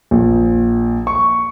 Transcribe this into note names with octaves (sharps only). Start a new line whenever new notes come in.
A#1
C#6